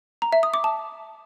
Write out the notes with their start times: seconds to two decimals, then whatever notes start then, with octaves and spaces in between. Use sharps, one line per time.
0.22 A#5
0.33 E5
0.43 D#6
0.54 D6
0.64 A5